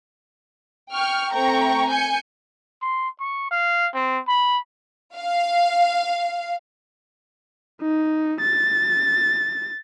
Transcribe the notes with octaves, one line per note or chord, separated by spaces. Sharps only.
G5 C#6 F6
A3 C4 G5 A#5 C#6
G#5 G6 C#7
C6
C#6
F5
C4
B5
F5
D#4
A6